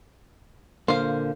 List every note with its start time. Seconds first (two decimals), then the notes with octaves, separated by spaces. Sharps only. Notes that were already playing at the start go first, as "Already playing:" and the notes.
0.88 A#2 D3 A#3 C5 F5